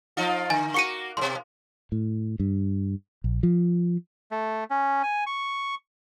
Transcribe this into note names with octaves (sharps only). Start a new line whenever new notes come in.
F3 D#4 F4
D3 G#5 A6
A#3 F#4 C#6 C#7 D#7
G#2 B2 C6
A2
G2
A#1
F3
A3
C#4
G#5
C#6